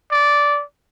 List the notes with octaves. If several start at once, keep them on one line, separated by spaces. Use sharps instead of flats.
D5